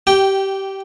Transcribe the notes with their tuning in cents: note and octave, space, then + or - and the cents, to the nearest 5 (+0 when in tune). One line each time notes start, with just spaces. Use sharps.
G4 -15 G5 +0